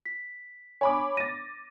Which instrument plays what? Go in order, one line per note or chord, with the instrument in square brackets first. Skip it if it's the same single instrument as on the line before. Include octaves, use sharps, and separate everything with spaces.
[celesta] B6
[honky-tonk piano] C#5 B5 D6 [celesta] G#5
[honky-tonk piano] A6 A#6 [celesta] D#7